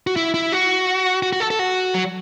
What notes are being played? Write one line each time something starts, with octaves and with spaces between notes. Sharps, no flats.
F#4
E4
E4
F#4
F#4
F#4
A4
A4
F#4
F#3